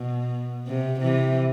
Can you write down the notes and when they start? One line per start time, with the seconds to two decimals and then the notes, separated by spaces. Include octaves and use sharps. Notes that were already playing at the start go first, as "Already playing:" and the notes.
Already playing: B2
0.67 C3
1.01 C3 E3